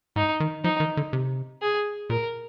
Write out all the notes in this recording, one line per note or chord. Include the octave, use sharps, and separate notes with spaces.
G#2 D#4
D#3
F3 D#4
D#3
D3
C3
G#4
A#2 A#4